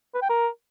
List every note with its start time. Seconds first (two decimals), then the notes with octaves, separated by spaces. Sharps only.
0.14 B4
0.22 G5
0.30 A#4